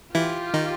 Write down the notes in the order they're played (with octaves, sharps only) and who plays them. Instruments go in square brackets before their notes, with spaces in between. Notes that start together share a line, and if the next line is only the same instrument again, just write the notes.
[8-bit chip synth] E3 E4 [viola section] F4 G4
[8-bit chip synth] D#3 D#4